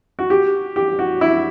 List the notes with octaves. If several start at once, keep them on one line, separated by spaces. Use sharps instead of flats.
F#4
G4
G4
F#4
E4